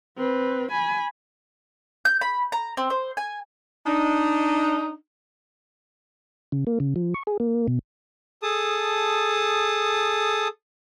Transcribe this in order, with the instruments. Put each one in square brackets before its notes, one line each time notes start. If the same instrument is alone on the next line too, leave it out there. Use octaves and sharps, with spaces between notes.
[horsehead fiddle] C4 B4
G#5 B5
[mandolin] G6
B5
A#5
C4
C5
G#5
[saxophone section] D4 D#4
[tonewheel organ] C#3
A#3
C#3
F3
C#6
G#4
A#3
B2
[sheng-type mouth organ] G#4 A4 A5 D#6